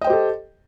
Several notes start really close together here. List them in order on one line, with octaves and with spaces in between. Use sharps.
D#5 G5 C5 G4 A4